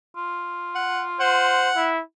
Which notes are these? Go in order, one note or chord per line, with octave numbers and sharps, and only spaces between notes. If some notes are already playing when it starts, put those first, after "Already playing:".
F4
F#5
C5 F#5
E4